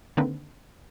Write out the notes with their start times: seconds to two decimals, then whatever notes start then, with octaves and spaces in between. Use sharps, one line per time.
0.17 D3 D#3 A#3 C4 D4 B4